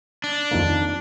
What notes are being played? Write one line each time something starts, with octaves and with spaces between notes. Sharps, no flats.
D4
F2 D#3 A#3